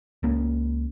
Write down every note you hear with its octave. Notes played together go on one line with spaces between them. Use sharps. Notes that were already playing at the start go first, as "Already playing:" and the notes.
C#2 A#3 C#4